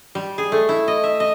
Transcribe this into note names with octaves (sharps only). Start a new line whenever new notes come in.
G3
G#4
A3
E4
D#5
E5
D#5